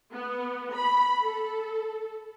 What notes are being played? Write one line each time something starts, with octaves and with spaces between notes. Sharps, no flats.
B3
B5
A4